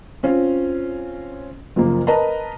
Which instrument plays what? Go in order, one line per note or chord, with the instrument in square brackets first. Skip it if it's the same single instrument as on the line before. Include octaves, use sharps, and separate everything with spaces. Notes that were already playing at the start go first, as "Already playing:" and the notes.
[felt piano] C4 C#4 F4
F#1 F3 A#3
A#4 B4 D#5 A5 A#5